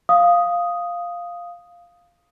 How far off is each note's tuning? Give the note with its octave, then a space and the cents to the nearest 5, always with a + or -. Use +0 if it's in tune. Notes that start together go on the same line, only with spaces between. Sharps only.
F5 +0 D#6 +0